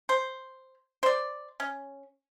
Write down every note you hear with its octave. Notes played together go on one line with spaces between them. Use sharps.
C5
C5 D5
C#4